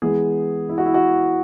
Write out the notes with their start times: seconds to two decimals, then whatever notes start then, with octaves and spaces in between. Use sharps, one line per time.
0.02 E3 G#3 B3 G#4
0.69 E4
0.78 F#4
0.86 E4
0.94 F#4